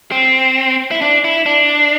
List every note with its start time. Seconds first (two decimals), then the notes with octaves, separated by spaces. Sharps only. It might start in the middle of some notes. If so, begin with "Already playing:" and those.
0.12 C4
0.91 E4
1.01 D4
1.25 E4
1.46 D4